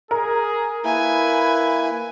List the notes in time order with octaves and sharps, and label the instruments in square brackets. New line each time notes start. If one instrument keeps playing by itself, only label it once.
[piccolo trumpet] G#4 [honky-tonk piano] A#4
[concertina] A#3 E4 [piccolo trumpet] B4 [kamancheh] G#5